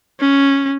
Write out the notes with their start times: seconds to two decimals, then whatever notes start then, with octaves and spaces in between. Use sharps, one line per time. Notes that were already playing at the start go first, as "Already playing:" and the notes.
0.20 C#4